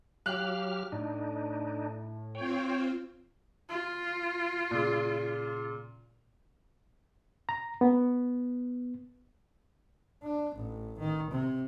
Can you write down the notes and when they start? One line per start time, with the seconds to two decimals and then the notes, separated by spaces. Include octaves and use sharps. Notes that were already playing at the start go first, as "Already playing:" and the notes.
0.26 F#3 G4 F5 F6 F#6
0.92 A2 D4 D#4
2.35 C4 F4 C5 C#5 G5
3.69 F4
4.71 A#2 C#3
7.49 A#5
7.81 B3
10.23 D4
10.56 A1
10.99 D#3
11.31 C3